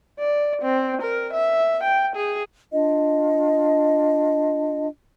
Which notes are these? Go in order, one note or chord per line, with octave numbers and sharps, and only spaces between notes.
D5
C4
A#4
E5
G5
G#4
D4 F4 D#5